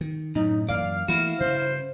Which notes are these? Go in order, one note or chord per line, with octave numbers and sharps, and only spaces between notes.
D#3
F#2 A2 D#4
F#2 E3 A#3 D5 F5
E3 A3 A#3 E4 F#4
G2 C#3 C5